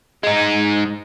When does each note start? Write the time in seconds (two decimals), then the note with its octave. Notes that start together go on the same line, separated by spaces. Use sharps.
0.23 G#3 D#4